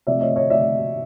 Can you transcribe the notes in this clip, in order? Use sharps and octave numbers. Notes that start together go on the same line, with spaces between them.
C3 F3 A3 D5 E5
C#5 D#5
C#5 D#5
D5 E5